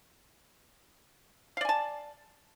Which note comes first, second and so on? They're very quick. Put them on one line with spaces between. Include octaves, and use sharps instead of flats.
F5 D5 G#5 A5